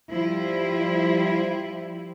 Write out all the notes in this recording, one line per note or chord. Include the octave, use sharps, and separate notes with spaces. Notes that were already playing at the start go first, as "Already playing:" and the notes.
F3 G3 E4